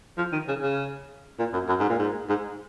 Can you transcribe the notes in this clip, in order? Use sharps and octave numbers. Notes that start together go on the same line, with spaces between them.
F3
D#3
C#3
C#3
A#2
F#2
F#2
G#2
A#2
G#2
G#2